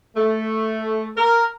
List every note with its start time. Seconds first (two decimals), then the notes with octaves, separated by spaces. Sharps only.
0.16 A3
1.17 A#4